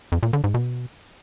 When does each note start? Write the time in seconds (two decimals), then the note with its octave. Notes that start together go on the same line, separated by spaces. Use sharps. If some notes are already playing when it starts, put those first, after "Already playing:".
0.12 F2
0.23 A#2
0.33 D3
0.44 G#2
0.54 B2